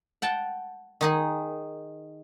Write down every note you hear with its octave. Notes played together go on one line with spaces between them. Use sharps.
F#5 G5 A5
D#3 D#4 G#4